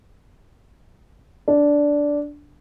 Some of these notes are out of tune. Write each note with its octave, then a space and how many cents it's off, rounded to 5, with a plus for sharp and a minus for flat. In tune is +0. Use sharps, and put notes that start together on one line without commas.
D4 -10